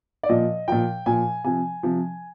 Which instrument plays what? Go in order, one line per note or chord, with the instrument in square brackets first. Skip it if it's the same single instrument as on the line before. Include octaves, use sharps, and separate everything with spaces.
[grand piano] D5
A#2 F3 D#5
A#2 F3 G5
A#2 F3 G#5
C3 F3 G#5
C3 F3